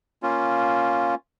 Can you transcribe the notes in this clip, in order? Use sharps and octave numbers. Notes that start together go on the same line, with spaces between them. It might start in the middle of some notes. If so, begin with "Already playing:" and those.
A#3 C#4 F4